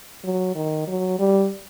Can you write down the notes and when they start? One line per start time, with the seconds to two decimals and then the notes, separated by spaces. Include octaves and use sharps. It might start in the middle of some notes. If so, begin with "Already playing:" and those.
0.24 F#3
0.55 D#3
0.87 F#3
1.19 G3